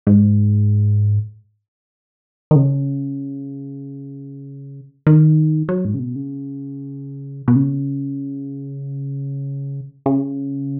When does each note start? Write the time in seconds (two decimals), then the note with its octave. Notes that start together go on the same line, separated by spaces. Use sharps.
0.07 G#2
2.51 D#3
2.56 C#3
5.07 D#3
5.69 F#3
5.85 G#2
5.94 C#3
5.99 B2
6.16 C#3
7.48 B2
7.56 C#3
10.06 C#3